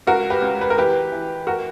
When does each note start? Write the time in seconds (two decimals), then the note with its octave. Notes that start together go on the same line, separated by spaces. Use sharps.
0.07 C#2 F#4 A#4
0.30 G4 B4
0.42 C#2
0.61 B4
0.70 A#4
0.77 E3 G4 B4
1.12 E3
1.47 F#4 A#4